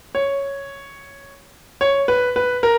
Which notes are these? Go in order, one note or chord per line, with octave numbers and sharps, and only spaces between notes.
C#5
C#5
B4
B4
A#4